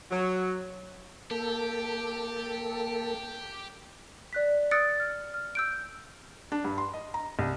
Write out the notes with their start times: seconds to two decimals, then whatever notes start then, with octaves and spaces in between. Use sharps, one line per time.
0.11 F#3
1.31 A#3 G4 A4
4.33 D5 F#6 B6
4.71 D#6 E6 F#6 A6 C#7 D7
5.00 F6
5.34 F6
5.55 E6 G6 D7
6.52 D4
6.65 G2
6.78 C6
6.93 D#5
7.14 A#5
7.39 C2